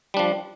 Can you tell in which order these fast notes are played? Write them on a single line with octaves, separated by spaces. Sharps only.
G3 D4 F3